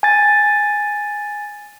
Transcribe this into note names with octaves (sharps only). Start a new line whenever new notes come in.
G#5 A6